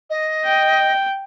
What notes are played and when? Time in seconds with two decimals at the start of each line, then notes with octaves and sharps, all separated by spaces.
0.10 D#5
0.45 G5